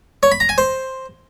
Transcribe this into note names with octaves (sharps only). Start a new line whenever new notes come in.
C#5
B5
A#5
G#5
C5